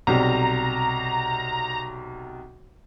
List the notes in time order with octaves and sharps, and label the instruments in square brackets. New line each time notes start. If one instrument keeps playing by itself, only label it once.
[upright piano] B1 C3 G3 [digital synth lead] A#5